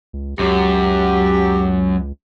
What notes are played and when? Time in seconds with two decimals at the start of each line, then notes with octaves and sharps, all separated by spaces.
0.13 C#2
0.39 C#2 F#2 F#3 G4